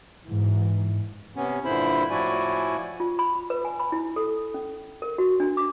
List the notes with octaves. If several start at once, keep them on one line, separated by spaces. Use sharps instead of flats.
G#2 E3
C3 B3 C#4
G2 A#2 D3 E4 C5 B5
A2 F3 E4 F#4 D5 G#5
F4
B5
B4
G#5
B5
E4
A4
C#4
A#4
F#4
D4
D6